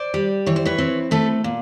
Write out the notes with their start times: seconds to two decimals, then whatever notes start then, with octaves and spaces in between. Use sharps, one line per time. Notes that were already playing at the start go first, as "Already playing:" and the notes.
Already playing: C5 D5
0.14 G3
0.46 E3 C#5
0.56 C5
0.65 B4 C#5
0.78 C4
1.11 A3 A4 B4
1.44 A#2